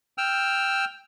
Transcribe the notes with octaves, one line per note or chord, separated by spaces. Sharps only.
G5 E6 F6